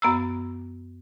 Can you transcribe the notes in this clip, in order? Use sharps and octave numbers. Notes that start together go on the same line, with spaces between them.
F#2 B3 A#5 E6